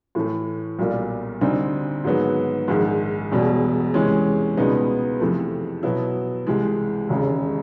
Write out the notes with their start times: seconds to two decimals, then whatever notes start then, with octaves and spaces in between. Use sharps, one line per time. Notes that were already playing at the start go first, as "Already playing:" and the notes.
0.15 A2 E3 A3
0.79 B1 A#2 G3 A#3
1.41 D2 D3 G3 C4 D#4
2.04 G#2 D#3 F#3 B3
2.68 A#1 G#2 D#3
3.32 E1 E2 B2 G3
3.94 E2 C3 E3 G#3 C#4
4.57 C#2 B2 G3 B3 D#4
5.20 F2 C3 E3 A3
5.83 B2 F#3 B3 E4
6.47 C2 C3 E3 G#3
7.09 E1 D#2 C#3